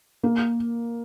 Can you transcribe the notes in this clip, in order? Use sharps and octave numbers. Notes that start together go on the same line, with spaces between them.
A#3